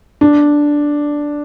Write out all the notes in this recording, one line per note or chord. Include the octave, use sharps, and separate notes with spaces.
D4